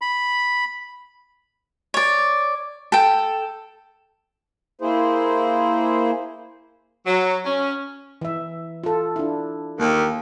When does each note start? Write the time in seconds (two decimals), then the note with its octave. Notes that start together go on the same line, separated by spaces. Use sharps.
0.01 B5
1.94 C#5 D5
2.92 A4 G5
4.81 A#3 E4 G#4 C5
7.06 F#3
7.45 C#4
8.21 E3 E5
8.84 F4 A4
9.16 D4 E4
9.80 D#2 A#3